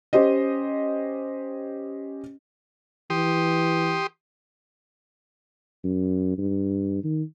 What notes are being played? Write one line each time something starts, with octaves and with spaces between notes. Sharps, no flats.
C#4 G4 C5 D#5
E3 G4 C6 D#6
F#2
G2
D#3